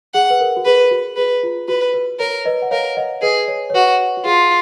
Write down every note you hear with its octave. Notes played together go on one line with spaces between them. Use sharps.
G#4 F#5
B4
A#4
F#4
G#4 B4
F#4
G#4 B4
F4
F#4 B4
B4
A#4 C#5
B4 D#5
F#5
A#4 C#5 F5
D#5 F#5
G#4 B4 D#5
C#5
C#5
F#4 B4
F#4
F4 G#4